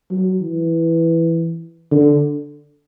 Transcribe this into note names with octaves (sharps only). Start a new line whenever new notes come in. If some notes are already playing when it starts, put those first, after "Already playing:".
F#3
E3
D3